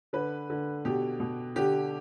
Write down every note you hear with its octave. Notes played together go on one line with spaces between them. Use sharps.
D3 B4
D3
B2 G4
B2
D3 G4